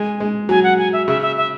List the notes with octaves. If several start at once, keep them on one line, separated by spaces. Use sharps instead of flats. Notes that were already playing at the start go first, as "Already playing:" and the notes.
Already playing: G#3 G#5
G#3
F#3 G#5
F#5
G#5
E5
C#3 E5
E5
E5